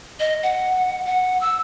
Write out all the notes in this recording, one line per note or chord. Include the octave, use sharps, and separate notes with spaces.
D#5
F#5
F#5
E6